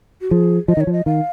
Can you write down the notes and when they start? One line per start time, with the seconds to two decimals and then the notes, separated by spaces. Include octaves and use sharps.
0.21 F#4
0.31 F3 G#4
0.68 F3 D#5
0.77 D#3 C#5
0.87 F3
0.93 D#5
1.06 D#3 F5